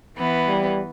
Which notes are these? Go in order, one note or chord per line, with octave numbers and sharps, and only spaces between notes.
E3 B3 E4
G3